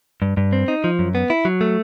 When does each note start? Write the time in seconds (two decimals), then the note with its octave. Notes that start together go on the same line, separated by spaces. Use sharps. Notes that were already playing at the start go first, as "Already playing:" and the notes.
0.22 G2
0.37 G2
0.53 C4
0.68 D#4
0.84 F3
0.99 F#2
1.15 B3
1.30 E4
1.45 F#3
1.61 A3